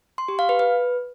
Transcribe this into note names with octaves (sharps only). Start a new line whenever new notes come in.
C6
G4
F5
B4
B4